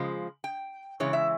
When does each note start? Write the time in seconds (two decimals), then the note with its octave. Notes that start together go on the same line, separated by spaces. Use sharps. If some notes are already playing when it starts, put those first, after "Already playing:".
Already playing: C#3 F3 G#3
0.44 G5
1.00 C#3 E3 G#3 C#5
1.13 E5